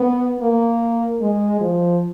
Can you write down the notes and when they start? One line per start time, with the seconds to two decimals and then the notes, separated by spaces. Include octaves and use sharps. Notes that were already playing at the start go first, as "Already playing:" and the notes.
Already playing: B3
0.40 A#3
1.21 G#3
1.61 F3